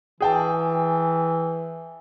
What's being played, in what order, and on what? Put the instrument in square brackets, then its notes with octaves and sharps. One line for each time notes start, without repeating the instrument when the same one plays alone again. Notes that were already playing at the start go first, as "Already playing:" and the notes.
[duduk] E3 [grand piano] G#4 G5 A5